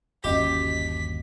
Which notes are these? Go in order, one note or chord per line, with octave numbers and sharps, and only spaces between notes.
G1 D#2 C#4 F#4 G4 D#5 E5 B6